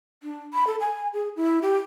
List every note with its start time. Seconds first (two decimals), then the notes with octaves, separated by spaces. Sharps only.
0.23 D4
0.53 B5
0.67 A4
0.80 G#5
1.14 G#4
1.36 E4
1.62 G4